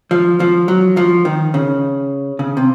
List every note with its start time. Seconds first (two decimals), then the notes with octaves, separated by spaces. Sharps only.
0.11 F3
0.40 F3
0.68 F#3
0.97 F3
1.25 D#3
1.54 C#3
2.39 C#3
2.57 C3